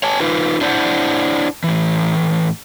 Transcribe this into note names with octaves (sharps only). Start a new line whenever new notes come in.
C#5 G#5 A5
D#4 F4 B4
D4 E4 C5 D5 F#5
A2 E3